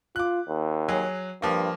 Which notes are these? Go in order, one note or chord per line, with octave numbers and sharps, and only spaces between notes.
F4 D6 F#6
D#2
F#3 G#4
G2 F3 A#3